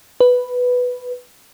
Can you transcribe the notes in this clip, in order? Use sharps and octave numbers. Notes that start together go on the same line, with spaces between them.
B4